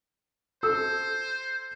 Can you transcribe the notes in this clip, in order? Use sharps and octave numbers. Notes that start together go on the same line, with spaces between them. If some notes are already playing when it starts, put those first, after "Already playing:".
A4 C5 E6